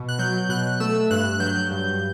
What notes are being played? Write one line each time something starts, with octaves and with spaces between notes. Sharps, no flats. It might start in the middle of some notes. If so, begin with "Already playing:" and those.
Already playing: B2
F#6
F#3 G6
B2 F#6
A3 E6
G2 F#6
F#3 G6
G2